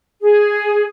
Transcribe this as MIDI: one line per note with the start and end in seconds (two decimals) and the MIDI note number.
0.21 0.84 68